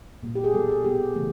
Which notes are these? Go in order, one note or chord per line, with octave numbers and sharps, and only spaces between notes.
A#2 G3 A#3
G4
G#4
B2 G3 B3 A4
G#4
B2 G3 B3 G4
C#3 E3 A3